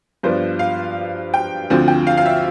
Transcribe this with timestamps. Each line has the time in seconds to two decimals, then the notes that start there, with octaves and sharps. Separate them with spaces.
0.23 G2 F3 B3 D4 C5
0.59 F5
1.34 G5
1.70 D2 D3 F3 C4
1.88 G5
2.07 F5
2.17 F5
2.26 E5